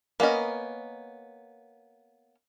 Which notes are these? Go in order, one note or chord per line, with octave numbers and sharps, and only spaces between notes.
A#3 B3 C#4 D#5